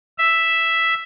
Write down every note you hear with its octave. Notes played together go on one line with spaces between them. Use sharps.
E5